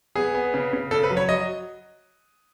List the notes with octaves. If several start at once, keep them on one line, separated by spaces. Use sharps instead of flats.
B3 G#4
B3
C#3
C#3
C#3 A4
B4
F#3
C#5
F#3 D#5